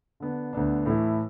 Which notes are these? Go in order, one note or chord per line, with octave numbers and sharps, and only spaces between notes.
D3 B3 D4
D2 D3 B3 D4
A2 E3 A3 E4